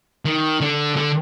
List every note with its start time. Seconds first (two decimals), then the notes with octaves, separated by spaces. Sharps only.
0.25 D#3
0.61 D3
0.96 D3